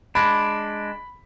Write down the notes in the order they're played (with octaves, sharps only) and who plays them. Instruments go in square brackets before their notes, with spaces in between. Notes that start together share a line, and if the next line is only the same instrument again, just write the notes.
[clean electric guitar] G#3 D4 [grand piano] B5